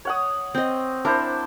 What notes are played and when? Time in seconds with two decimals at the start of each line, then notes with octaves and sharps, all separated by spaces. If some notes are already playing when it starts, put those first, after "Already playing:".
0.05 C#5 F#5 D#6
0.55 C4 D#5
1.05 D4 E4 A#4 C5